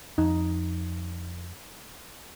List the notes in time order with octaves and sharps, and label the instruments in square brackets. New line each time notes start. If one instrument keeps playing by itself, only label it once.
[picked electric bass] F2 [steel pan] D#4